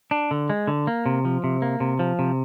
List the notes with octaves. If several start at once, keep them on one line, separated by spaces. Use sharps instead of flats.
D4
D3
G#3
D3
A#3
C3
F3
C3
A#3
C3
F3
C3